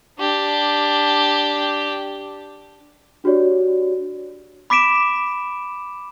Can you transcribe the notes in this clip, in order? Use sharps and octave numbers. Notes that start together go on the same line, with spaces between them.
D4 G4
D4 F#4 G4 C#5 D5
B5 D6 B6 D7 E7